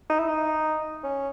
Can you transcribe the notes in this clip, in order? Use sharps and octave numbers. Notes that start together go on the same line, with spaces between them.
D#4
E4
D#4
C#4